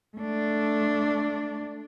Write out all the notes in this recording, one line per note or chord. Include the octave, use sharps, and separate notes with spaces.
A3 D4